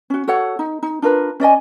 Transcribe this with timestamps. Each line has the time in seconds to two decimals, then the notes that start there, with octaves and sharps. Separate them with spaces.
0.10 C#4 F#4
0.28 F#4 A4 C#5 F#5
0.59 D#4
0.83 D#4
1.02 D4 F4 A#4 B4
1.40 C#4 D5 D#5 G#5